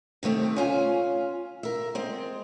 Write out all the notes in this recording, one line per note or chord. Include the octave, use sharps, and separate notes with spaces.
C3 D#3 A3 C4
C#4 F4 G#5
A#4 E5
G#3 C4